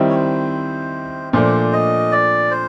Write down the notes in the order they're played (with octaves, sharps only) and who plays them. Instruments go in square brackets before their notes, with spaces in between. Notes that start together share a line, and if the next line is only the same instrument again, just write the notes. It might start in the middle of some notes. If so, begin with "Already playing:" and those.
Already playing: [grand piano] D#3 G3 C4 E4
[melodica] C#5
C5
[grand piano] A#2 F3 A3 D4 [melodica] C5
[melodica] D#5
D5
C5